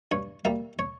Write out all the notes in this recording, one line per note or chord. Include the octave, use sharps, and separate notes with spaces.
G2 C#5
G3 A#3 E5
C#5